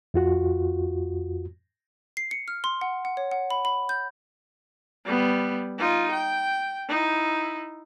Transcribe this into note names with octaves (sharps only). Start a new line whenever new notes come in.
F2 F4 F#4
C7
C#7
F6
C6
F#5
F#5
C#5
F#5
B5
B5
G6
G3 B3
D#4 F4
G5
D#4 E4